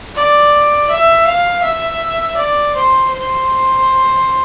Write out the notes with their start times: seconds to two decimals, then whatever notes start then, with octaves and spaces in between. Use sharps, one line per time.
0.16 D5
0.90 E5
1.27 F5
1.63 E5
2.37 D5
2.75 C5
3.11 C5